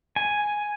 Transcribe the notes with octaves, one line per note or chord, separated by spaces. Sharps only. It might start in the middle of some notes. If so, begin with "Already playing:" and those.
G#5